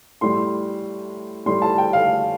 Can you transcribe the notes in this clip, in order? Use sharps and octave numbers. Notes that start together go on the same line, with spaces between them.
A2 G3 C6
A2 G3 C6
A5
G5
F5